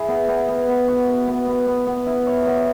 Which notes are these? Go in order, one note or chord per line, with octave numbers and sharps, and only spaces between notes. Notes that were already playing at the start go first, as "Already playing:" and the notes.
Already playing: E4 G#4
B3
B3
B3
B3
F#4
B4
B3
B3
B3
B3
E4
C#5
B3